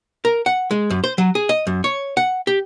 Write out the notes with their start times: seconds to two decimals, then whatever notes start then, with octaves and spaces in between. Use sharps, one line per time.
0.25 A#4
0.46 F#5
0.71 G#3
0.90 F#2
1.04 C5
1.18 F#3
1.35 G#4
1.49 D#5
1.67 F#2
1.84 C#5
2.17 F#5
2.47 G4